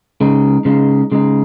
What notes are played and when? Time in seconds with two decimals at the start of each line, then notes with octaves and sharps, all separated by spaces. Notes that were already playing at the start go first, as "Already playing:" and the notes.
0.21 C#3 G#3 D#4
0.65 C#3 G#3 D#4
1.12 C#3 G#3 D#4